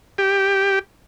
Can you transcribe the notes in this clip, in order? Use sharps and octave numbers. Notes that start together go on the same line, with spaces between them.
G4